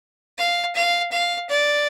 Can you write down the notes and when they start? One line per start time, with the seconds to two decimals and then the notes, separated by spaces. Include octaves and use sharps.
0.38 F5
0.75 F5
1.12 F5
1.50 D5